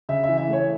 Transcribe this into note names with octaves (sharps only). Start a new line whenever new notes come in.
C#3 E5
E3 E5
E5
A3 C#5